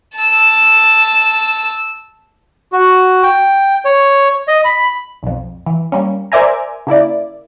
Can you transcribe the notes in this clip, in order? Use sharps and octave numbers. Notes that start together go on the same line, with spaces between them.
A5 E6
F#4
G5
C#5
D#5
B5
B1 F2
E3
G3 A#3 C#4
A#4 C5 D5 E5 G#5 A#5
C#3 A#3 E4 D5